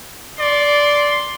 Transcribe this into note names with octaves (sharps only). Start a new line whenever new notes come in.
D5 C6